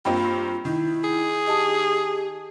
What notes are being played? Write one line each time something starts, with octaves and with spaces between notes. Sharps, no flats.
G2 A#3 C4 F4 G5 B5
D#3 E4
G#4
G4 D#5 A5 D#6